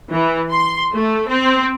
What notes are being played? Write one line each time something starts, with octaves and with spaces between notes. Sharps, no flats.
E3
C6
A3
C4